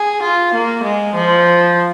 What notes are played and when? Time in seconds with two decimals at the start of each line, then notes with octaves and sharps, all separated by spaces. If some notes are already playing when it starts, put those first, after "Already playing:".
Already playing: G#4
0.22 F4
0.54 A#3
0.83 G#3
1.14 F3